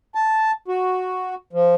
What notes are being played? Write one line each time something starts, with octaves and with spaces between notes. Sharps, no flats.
A5
F#4
F3